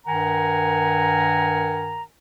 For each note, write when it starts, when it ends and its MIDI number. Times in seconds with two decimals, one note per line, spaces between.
0.07 2.03 43
0.07 2.03 51
0.07 2.03 70
0.07 2.03 78
0.07 2.03 80
0.07 2.03 82